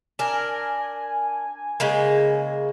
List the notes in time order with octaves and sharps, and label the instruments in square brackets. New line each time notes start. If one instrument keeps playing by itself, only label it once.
[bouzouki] D4 A#4 [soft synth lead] G#5
[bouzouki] C#3 G#3 A#3